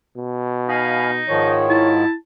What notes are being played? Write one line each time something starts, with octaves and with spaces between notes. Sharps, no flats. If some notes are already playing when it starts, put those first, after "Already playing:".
B2
D#4 F5 G#5 B5
G#2 D#3 F3 C#5
E4 A5